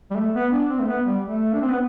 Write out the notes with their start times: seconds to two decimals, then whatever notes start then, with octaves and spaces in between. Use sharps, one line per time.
0.11 G3
0.15 A3
0.34 B3
0.52 D4
0.70 C4
0.80 A3
0.88 B3
1.06 G3
1.24 A3
1.54 D4
1.62 C4
1.70 B3